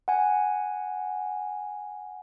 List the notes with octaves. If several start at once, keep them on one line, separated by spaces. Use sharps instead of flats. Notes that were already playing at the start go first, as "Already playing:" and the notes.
F#5 G#5